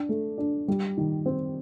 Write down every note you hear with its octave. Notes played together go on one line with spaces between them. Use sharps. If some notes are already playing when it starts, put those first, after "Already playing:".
Already playing: D4
A3
D4
G3
D#3
C4